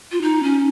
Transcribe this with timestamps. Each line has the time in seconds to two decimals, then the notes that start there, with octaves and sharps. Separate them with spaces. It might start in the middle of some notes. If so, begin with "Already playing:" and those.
0.12 F4
0.22 D#4
0.43 C#4